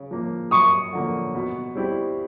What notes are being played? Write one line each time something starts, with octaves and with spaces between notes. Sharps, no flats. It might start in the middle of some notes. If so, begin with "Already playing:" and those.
Already playing: C#3
F3 A#3
F#2 C#6 D#6
D3 F3 A#3 C#4
B2
G3 C4 E4 G4